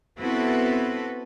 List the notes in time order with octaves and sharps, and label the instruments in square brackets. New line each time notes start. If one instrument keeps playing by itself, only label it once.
[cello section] B3 C4 E4 F#4 A4 B4